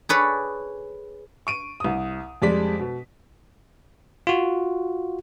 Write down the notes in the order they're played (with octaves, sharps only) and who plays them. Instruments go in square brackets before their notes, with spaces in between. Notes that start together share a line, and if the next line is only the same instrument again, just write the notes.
[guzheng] G#4 A4 B4 C#5 D5
[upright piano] C#6 D7 D#7
C2 D#6
F2 G3 G#3 D5 B6
B2
[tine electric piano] F4 F#4